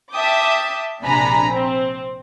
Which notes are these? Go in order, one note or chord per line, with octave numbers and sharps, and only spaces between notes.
E5 G5 A5 D6 D#6
A#1 C3 D4 G#5 A#5 B5
C4